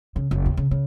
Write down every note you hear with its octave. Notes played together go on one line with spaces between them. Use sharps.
C#3
F#1
D#2
C#3
C#3